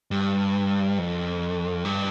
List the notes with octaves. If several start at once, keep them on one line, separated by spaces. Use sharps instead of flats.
G2
F2
G2